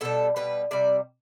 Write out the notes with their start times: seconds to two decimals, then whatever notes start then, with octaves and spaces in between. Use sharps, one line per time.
0.01 B2 G3 A4
0.36 B2 G3 B4
0.71 C3 G3 D5